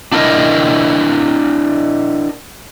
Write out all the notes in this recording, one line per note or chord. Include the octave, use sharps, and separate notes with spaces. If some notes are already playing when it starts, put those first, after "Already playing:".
D4 E4 A#4 D#5